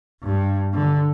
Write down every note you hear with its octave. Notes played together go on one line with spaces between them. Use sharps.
G2
D3